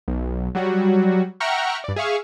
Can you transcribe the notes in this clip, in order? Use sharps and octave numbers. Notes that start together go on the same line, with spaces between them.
B1
F#3 G3 F#4
E5 F#5 G5 A#5 C#6 F6
G2 D5
G#4 E5 F5 C#6